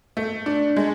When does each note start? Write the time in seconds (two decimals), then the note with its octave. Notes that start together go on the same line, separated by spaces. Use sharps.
0.17 A3
0.46 D4
0.76 G#3